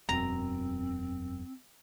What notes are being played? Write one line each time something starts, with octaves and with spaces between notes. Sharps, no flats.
E1 F#2 C4 A#5